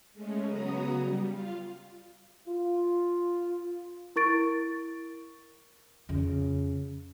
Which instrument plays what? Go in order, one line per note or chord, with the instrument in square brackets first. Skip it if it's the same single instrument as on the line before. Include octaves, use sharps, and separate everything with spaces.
[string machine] G#3 A3 C#4
C#3 F#3 B3 F#4 A#5 D#6
G3
F4 F5
[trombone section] F4
[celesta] E4 A#4 C#6 A6 D7
[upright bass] F2 C#3